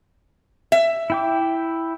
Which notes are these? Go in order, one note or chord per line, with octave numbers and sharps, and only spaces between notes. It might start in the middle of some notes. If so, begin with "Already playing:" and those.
E5
E4 G5 D6